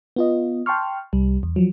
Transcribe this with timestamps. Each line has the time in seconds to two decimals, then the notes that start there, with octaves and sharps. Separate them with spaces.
0.16 B3 F4 D#5
0.66 G5 A5 C6 C#6 F6
1.13 C2 G3
1.43 E2
1.56 F3 F#3